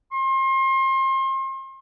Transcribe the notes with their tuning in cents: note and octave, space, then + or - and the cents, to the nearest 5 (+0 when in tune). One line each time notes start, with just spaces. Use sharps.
C6 +35